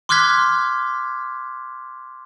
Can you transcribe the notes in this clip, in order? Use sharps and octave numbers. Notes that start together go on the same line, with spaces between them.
C6 D6 F6 F#6 G#6 B6